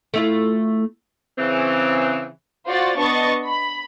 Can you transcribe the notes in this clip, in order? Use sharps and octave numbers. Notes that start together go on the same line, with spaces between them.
A3 E4 F4
C#3 E3 C4
F4 F#4 C5 D5 A6
B3 D4 D#5 C#6 A6
B5